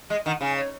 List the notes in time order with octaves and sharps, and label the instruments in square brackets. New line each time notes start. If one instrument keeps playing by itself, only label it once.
[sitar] G#3 [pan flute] D#5
[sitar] D#3 [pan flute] F#5
[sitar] C#3 [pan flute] G#5
[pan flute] C#5